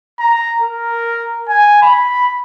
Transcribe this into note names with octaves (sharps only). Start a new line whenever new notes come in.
A#5
A#4
G#5
B5